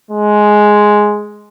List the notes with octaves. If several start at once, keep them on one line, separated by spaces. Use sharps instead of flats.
G#3